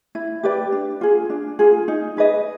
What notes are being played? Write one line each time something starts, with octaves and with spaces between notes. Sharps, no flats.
E4
G4 B4 D5
D4
F4 G#4
D4
F4 G#4
D#4
G#4 B4 D#5